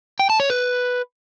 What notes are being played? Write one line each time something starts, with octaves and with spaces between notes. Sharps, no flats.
G5
A5
C#5
B4